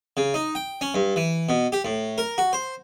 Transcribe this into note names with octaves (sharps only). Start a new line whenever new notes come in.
C#3
D#4
G5
C#4
G2
E3
B2
G4
A2
A#4
F#4
C5